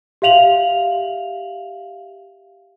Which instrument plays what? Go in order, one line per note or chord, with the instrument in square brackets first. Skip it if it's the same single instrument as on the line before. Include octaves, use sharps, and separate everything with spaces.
[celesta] G4 E5 F5 F7 F#7